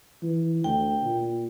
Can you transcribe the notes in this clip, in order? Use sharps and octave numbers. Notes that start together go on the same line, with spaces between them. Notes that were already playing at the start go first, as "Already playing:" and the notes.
E3
D2 G5
A#2